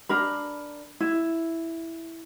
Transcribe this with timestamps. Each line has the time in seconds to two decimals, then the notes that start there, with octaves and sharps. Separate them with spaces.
0.09 D4 A#4 B5
1.00 E4